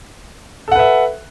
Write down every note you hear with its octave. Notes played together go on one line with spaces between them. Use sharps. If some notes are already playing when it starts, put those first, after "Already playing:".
A4 B4 E5 F#5